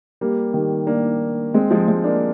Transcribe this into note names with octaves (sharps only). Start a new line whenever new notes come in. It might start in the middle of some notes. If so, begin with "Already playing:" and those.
G3 A#3
D#3 G3
A#3 D4
G#3 C4
F3 G#3
G#3 C4
A#3 D4